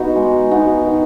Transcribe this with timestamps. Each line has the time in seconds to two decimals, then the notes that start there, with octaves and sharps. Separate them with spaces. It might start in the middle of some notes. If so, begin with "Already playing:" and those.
Already playing: B3 D#4 F#4
0.16 G#3
0.51 B3 D#4 F#4
0.86 D#3